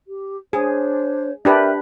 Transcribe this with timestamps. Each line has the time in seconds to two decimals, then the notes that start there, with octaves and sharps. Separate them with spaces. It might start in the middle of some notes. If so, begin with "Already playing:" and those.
0.06 G4
0.53 D4 G#4 C5 C#5
1.45 D4 G4 A#4 B4 E5